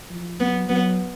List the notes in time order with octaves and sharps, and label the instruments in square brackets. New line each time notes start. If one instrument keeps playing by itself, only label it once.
[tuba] F3
[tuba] F#3 [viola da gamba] B3
[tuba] F#3 [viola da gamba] B3